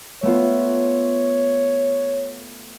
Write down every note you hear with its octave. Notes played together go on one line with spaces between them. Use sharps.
A3 B3 F4 C#5